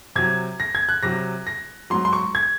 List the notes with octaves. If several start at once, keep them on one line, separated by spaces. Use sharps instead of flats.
C3 F#3 G#6
A#6
G#6
F#6
C3 F#3 A#6
A#6
G#2 F#3 C6
C6
C#6
G#6